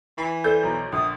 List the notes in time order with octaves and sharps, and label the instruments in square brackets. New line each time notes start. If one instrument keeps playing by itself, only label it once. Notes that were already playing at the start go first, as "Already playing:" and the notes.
[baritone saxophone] E3 [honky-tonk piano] B5
[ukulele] A4 C5 D5 [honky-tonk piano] G6
[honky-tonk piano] B1 [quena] A#5
[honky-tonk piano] A#1 D3 [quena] D#6